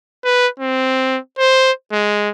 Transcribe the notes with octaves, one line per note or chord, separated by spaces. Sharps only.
B4
C4
C5
G#3